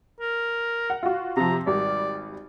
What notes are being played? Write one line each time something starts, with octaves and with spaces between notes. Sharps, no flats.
A#4
F#5
F4 F#4
C3 F3 A#5
G#1 G3 D5